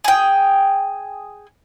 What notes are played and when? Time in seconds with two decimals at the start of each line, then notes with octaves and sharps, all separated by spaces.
0.04 G#4 G5